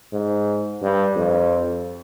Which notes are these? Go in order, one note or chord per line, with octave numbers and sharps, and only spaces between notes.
G#2
G2
F2